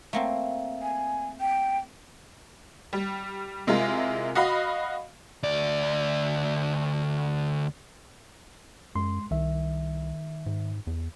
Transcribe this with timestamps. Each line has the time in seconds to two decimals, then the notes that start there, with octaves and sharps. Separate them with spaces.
0.13 A3 A#3 C4
0.82 G#5
1.41 G5
2.93 G3
3.67 C3 G#3 E4 F4 A#4
4.35 F#4 D#5 F5 B5
5.43 D2 D5
8.95 F#2 G#3 C6
9.31 C2 D#3 E5
10.46 G#2
10.87 E2